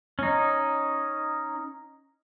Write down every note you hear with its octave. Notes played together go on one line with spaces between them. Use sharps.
C#4 D#4